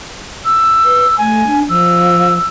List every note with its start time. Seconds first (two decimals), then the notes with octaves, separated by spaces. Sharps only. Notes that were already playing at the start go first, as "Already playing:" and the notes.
0.45 E6
0.85 B4
1.18 A3 G#5
1.47 D4
1.69 F3 E6